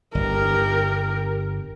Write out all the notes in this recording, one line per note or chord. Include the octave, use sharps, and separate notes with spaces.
G1 G4 A#4